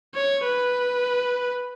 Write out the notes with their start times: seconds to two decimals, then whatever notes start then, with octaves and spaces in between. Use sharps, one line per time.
0.15 C#5
0.44 B4